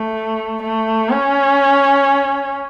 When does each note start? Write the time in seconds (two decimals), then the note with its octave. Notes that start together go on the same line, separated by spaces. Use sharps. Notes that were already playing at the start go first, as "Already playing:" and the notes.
Already playing: A3
0.63 A3
1.10 C#4